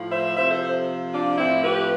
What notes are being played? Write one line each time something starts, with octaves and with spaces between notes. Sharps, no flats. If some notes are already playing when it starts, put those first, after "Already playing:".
Already playing: A2 F3
C5 E5
C3 F3 C5 E5
A4 C5
A4 C5
D4 F4
A2 F3 C4 E4
G4 B4